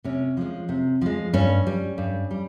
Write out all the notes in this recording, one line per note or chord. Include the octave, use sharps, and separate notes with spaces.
C3 C#4
F3 G#3
C3
F3 G#3
G2 C#4
G3
G2
G3